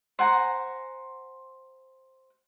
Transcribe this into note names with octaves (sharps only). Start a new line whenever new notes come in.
C5 F#5 G#5 A#5